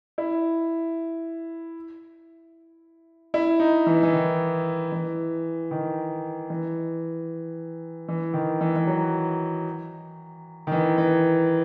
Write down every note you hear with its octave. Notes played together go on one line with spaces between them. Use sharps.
E4
E4
D#4
E3
E3
D#3
E3
D#3
E3
E3
D#3
E3
E3
F#3
D#3
E3
E3